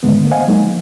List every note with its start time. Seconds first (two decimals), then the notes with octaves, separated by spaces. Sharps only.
0.03 G#2 D3 D#3 G#3 A3 B3
0.20 D3 A#3
0.31 C5 D#5 F5 F#5 G#5
0.48 F#3 G#3 A#3 D#4
0.61 F3